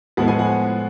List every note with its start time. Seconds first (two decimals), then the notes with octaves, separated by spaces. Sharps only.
0.17 A2 F3 G#3 B3 F#5
0.28 G#5
0.39 F#5